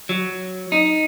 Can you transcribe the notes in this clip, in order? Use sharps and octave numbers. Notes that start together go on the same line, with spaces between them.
F#3
D#4